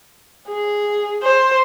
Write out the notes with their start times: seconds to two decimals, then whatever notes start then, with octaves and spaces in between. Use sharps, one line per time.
0.49 G#4
1.23 C5